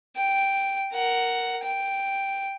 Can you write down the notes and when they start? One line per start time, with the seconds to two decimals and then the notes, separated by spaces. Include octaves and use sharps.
0.17 G5
0.93 A#4 F#5
1.63 G5